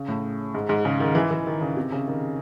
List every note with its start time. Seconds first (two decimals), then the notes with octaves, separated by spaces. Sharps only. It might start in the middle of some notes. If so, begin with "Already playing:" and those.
Already playing: C#3
0.08 A2
0.54 G#2
0.69 G#2
0.85 C#3
1.00 D#3
1.15 E3
1.31 E3
1.47 D#3
1.61 C#3
1.76 C3
1.92 C#3
2.08 D#3